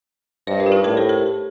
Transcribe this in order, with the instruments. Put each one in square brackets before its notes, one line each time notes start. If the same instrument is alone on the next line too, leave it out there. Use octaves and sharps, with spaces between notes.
[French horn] G2 [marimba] C5 D#5
[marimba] A#4 D5
F4
D#4 G4
[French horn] A2 [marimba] G4 A#4
[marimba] A4 C5
G4 A#4